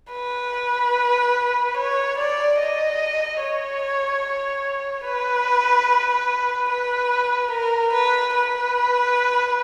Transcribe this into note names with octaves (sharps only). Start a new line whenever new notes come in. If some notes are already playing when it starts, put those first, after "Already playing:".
B4
C#5
D5
D#5
C#5
B4
B4
A#4
B4
B4